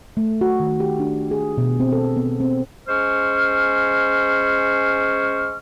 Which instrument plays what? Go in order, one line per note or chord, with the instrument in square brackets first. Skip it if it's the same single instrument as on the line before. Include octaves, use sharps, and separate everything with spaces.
[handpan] A3
F#4
D#3
G4
D4
G#4
B2
C4
A4
B3
C4
[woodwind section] G#3 C#4 C5 C#6 F6